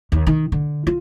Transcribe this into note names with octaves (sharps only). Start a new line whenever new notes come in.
D#2
D#3
D3
F4